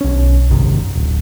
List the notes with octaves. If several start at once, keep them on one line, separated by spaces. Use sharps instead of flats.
B1 C#4
G#1 F#2 C3 D#3
D1